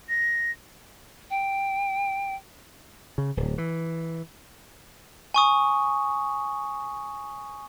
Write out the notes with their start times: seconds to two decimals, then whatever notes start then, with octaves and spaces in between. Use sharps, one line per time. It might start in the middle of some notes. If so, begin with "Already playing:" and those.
0.09 A#6
1.30 G5
3.18 C#3
3.37 D1
3.58 E3
5.34 G#5 C#6 D#6